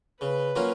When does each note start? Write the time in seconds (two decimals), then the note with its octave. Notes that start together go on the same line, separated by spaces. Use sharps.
0.20 C#3 B4
0.55 F#3 A#3 C#4 F4